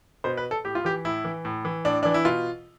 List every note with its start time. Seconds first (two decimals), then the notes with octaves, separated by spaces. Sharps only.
0.24 B2 C5
0.37 B4
0.51 A4
0.64 A2 G4
0.75 F4
0.85 E3 G4
1.05 A2 E4
1.25 E3
1.45 A2
1.65 E3
1.85 A2 D4
2.03 E3 D4
2.14 E4
2.25 B2 F4